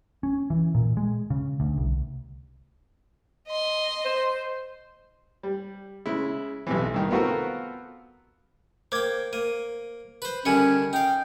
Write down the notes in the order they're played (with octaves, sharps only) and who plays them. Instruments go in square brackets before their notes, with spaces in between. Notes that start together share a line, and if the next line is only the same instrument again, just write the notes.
[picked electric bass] C#4
E3
A#2
G#3
C#3
D2
C2
[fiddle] D#5 C6
[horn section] C5
[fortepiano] G3
C#3 G#3 E4
B1 C3 E3
C2 D#3
B3 C4 F4 F#4 A4 A#4
[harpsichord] A#3 G5 [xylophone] C5 D6 G#6
[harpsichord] A#3 [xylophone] D#7
[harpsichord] B4 C5
[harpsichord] D3 D#3 G3 [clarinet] C#4 [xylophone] G#5 C#7
[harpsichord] D#4 F5 [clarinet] G5